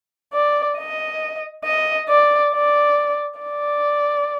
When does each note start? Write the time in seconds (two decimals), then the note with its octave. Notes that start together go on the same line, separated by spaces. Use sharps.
0.34 D5
0.78 D#5
1.65 D#5
2.09 D5
2.53 D5
3.40 D5